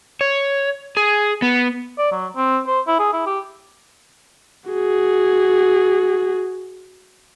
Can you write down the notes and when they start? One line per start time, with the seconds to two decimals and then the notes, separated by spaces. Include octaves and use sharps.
0.21 C#5
0.97 G#4
1.42 B3
1.98 D5
2.12 F#3
2.37 C4
2.67 C5
2.88 E4
2.99 G#4
3.13 E4
3.26 G4
4.70 F#4 G#4